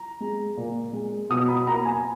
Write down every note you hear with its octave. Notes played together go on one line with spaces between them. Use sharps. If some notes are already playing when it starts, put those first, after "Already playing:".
Already playing: A#5
G#3
A#2
G#3
B2 D#6
B5
A#3 A#5
G#5